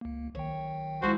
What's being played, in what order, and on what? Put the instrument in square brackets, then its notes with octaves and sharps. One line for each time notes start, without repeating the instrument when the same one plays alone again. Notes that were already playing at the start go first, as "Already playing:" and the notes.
[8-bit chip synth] C#2 A#3
[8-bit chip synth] B1 D#3 G5 [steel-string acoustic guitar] C#5
[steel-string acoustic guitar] F3 G#3 E4 [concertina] F#4 C5